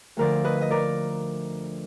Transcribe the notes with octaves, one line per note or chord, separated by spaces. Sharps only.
D2 D3 F3 A#4 D5
B4 D#5
D#5
A#4 D5